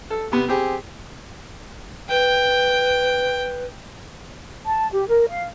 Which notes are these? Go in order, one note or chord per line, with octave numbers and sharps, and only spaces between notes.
A4
C3 B3
C4 G4 G#4
B4 G5
A5
G4
A#4
F5